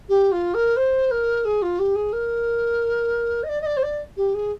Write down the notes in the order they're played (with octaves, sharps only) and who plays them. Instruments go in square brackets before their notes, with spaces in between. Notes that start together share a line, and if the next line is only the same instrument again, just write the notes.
[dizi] G4
F4
A#4
C5
A#4
G#4
F4
G4
G#4
A#4
D#5
D5
D#5
D5
C5
D5
G4
G#4